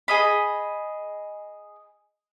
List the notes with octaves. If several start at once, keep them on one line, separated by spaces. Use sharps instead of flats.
G#4 D#5 B5